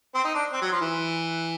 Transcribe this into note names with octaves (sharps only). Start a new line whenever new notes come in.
C4
D#4
D4
C4
F#3
F3
E3